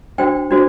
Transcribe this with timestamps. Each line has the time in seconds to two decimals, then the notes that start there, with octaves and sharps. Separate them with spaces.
0.18 D4 F#4 C5 G5
0.51 D4 F#4 C5